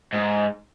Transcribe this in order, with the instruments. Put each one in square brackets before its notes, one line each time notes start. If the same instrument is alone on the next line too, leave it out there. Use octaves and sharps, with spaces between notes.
[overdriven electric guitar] G#2